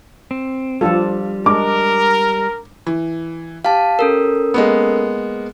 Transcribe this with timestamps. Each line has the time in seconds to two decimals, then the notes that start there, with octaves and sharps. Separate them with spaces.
0.31 C4
0.81 F3 G3 D4 F4 A4
1.46 G#3 D4 A#4 D6
2.86 E3
3.65 G4 F5 A5
3.99 C#4 A4 A#4
4.54 G#3 A#3 B3